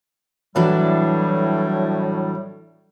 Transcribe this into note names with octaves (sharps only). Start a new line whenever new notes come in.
A2 E3 F#3 G3 D4